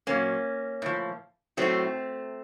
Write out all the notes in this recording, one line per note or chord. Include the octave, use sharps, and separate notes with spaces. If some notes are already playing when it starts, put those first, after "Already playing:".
A#2 F#3 A#3 C#4
A2 F3
A2 F#3 A3 C4